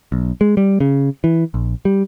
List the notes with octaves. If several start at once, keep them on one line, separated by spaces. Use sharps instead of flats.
B1
G#3
G3
C#3
E3
A#1
G3